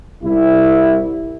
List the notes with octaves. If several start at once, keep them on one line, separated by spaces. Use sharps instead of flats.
C2 E4